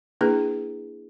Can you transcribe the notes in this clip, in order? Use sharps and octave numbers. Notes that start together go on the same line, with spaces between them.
A#3 D4 E4 G#4 B4